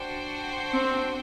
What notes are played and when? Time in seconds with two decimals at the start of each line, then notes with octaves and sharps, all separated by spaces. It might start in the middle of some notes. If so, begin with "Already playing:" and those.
Already playing: D4 F#4 C5 G5
0.74 C4